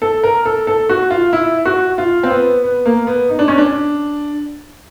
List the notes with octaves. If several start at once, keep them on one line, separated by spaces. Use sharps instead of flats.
A4
A#4
A4
A4
F#4
F4
E4
F#4
F4
C4
B3
B3
A#3
B3
D#4
D4
C#4
D4